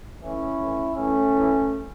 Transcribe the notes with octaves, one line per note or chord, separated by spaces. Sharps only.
A2 E3 C#4 E4
A2 E3
A2 E3 A3 C#4
A2 E3